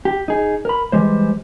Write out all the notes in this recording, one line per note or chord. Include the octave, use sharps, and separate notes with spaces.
G4
D#4 G#4
A#4 B5
E3 G3 G#3 C5